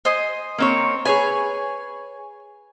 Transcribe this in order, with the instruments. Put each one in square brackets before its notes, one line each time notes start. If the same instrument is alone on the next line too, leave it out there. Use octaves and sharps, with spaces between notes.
[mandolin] C5 D#5 G#5
[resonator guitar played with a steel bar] A#3 C4 C#5
[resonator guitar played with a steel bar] G#4 B4 [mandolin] C#5 G#5